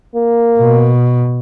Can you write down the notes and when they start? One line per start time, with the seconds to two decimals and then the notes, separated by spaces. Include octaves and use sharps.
0.15 A#3
0.58 B2